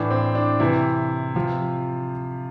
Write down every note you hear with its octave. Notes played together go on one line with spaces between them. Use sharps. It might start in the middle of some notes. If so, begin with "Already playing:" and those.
Already playing: A2 E3 D4
C4
D4
C3 E3 E4
C3 F3